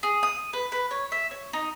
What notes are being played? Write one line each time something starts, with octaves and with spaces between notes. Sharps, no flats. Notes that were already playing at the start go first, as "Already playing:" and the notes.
G#4
D#6
B4
B4
C#5
E5
C#5
D#4